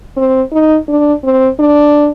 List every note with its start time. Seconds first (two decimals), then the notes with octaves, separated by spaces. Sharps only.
0.17 C4
0.52 D#4
0.88 D4
1.24 C4
1.59 D4